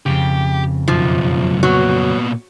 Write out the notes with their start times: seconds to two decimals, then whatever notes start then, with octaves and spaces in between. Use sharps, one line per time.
0.06 F2 G#2 C#3 G4
0.88 B1 F#2 F3
1.63 A#2 F#3 B3